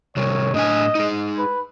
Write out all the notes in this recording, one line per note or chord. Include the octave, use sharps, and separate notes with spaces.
C3 D#3 G3 C#5
A2 D4 D#5 G#5
D#4 G#4
B4